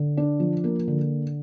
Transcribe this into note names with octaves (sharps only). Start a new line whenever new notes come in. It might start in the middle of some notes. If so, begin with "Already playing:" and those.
Already playing: D3
D4
F3
A#3
D3